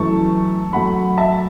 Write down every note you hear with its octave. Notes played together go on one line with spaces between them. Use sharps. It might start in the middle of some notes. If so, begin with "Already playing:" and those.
Already playing: F#2 E3 A3 A5 C#6
F#2 F#3 A3 F#5 B5
E5 A5